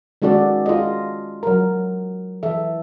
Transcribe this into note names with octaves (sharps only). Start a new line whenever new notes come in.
D#3 G#3 C#4 F#4 A4 D5
F4 G#4 D#5
F#3 A#4
E3 A4 E5